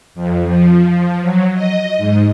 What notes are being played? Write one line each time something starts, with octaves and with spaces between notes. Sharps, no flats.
F2
F3
F#3
D#5
G#2